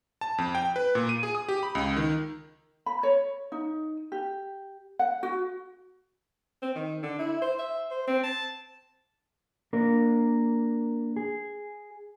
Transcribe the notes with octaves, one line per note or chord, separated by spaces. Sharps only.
A5
F2
G5
B4
A#2
D#7
G#4
D#6
G4
B5
C#2
D#3
B5
C#5
D#4
G4
F#5
F#4
C4
D#3
D3
E4
C5
E5
C5
C4
A5
A#3 D4 A#4
G#4